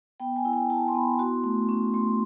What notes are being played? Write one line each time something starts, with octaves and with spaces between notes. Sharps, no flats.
B3 G5
G#5
E4
G5
E4 A5
C6
B3 B5
F#4 C6
A3
C#4
A3 C6